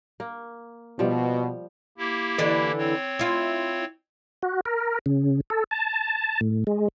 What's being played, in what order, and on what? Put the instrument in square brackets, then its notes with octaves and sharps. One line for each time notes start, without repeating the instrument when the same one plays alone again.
[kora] A#3
[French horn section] B2 [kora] F3 G3
[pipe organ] A#3 E4 G4
[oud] D3 E3 D5
[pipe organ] C4 C#5
[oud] E4 F4
[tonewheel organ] F#4
A#4
C#3
A4
A5
A2
G#3